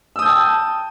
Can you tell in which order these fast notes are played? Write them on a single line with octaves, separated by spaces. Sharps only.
E6 D#6 G6 A5 G5